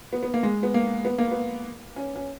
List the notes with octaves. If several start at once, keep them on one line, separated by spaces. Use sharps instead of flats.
B3
B3
A#3
G#3
B3
A#3
B3
A#3
B3
C#4
C#4